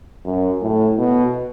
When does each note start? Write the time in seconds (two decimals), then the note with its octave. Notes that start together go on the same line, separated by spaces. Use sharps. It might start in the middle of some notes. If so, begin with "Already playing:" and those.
0.25 F#2
0.61 A2
0.98 B2